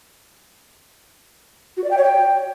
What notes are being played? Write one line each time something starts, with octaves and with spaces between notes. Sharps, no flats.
F#4
D5
G5
C#5
G5